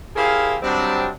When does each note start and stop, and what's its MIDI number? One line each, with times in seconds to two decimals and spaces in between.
0.16 0.57 64
0.16 0.57 67
0.16 0.57 68
0.16 0.57 70
0.16 0.57 72
0.16 0.57 77
0.63 1.09 48
0.63 1.09 54
0.63 1.09 55
0.63 1.09 60
0.63 1.09 62